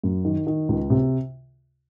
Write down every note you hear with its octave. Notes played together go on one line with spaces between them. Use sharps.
F#2
D#3
D#3
C#2
C3